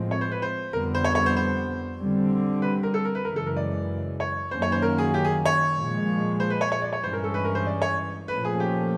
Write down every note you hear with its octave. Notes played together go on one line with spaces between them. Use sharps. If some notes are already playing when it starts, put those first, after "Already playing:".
Already playing: A2 F3 G#3 C4
C#5
C5
B4
C5
F2 D3 G3 B3 A#4
C5
C#5
C#5
C5
C5
D3 G3 C4
B4
A#4
A4
A#4
B4
F#2 C#3 E3 G#3 A#4
A4
A#4
D5
C#5
F#2 D#3 F#3 A#3 C#4 C5
C#5
C5
A#4
G#4
G4
G#4
C#5
A#2 F3 G#3
C5
B4
C#5
C#5
D5
C#5
G2 E3 G#3 C#4 C5
A#4
A4
B4
A#4
C5
D5
C#5
A#2 F3 A3 C#4 B4
G#4
G4